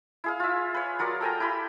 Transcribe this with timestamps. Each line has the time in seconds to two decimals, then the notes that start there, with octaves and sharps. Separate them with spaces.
0.24 E4 G#4 F5
0.40 F4 E5
0.74 B4 C#5
0.99 F#3 F4 A#4 D5
1.21 A4 G5 G#5 A#5
1.40 E4 G4 B5 C6